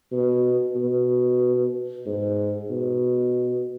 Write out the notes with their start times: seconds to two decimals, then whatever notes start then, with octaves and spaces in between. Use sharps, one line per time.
0.12 B2
0.75 B2
2.06 G#2
2.70 B2